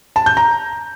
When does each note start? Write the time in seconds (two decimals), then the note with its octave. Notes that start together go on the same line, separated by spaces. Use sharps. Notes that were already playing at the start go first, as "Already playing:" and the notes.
0.16 A5
0.26 G6
0.37 A#5